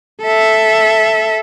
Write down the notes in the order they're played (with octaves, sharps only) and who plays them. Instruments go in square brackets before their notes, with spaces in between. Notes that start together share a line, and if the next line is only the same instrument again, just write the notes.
[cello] A4 E5